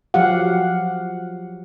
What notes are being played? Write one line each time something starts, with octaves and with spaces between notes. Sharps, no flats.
F3 F#3 G4 F5 F#5